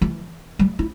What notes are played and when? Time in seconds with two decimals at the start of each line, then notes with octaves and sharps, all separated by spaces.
0.02 E3
0.59 G3
0.79 E4